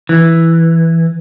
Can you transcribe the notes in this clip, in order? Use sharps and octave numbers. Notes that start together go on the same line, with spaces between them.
E3